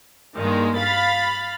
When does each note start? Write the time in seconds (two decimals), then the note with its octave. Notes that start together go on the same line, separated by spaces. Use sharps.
0.35 G2 D#3 G#3 A#3
0.77 F5 B5 A6